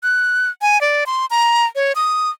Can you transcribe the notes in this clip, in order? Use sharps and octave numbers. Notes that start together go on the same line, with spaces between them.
F#6
G#5
D5
C6
A#5
C#5
D#6